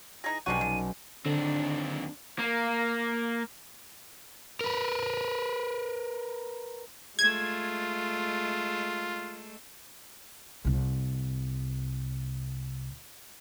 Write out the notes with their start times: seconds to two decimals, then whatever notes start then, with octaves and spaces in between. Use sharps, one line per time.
0.24 E3 D#4 G#4 A#6
0.46 B1 C3 C#4 D4 F#4 D#7
0.61 D3
1.26 D#2 D3 C4 D4
2.39 A#3
4.61 A#4 B4
7.19 G#3 A3 F4 G#6
10.65 C2 C3